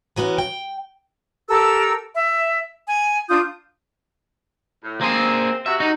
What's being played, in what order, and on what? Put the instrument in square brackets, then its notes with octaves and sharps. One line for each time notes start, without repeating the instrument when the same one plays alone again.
[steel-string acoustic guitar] E3 F#3 B3 C#4
G5
[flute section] G4 A4 A#4 E6
E5
G#5
D4 F4 D#6 G6
[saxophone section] A2
[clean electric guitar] A#3 G#4 [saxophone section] C4
[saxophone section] C3 F#4 [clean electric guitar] E5
[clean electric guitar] D#4